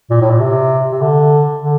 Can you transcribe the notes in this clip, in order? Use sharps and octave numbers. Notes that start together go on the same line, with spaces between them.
A#2
A2
A#2
C3
C3
D3
D3